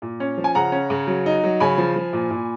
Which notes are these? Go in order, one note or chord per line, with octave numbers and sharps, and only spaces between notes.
A#2
C#4
F3
G#5
C#3 F#5 A#5
C#4
C#3
F#3
D#4
F#3
C#3 G#5 B5
F3
F3
A#2
A#2